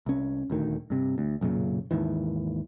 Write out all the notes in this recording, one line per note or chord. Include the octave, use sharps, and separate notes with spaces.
C2 C#4
D#1 D2 D#3
G2 C3
D2
B1 F#2 A#2 C#3
D#2 G#2 D#3 E3